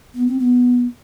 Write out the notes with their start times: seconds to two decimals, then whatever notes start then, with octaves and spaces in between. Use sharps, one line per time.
0.14 B3
0.27 C4
0.39 B3